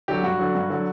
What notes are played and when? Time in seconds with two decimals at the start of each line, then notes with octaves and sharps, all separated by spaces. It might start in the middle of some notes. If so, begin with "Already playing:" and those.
0.08 D3 F#3 G4
0.23 G2 F#4
0.39 D3 F#3
0.55 G2
0.70 D3 F#3